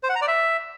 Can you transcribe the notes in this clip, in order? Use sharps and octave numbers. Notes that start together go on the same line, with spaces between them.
C5
F#5
A#5
D5
E5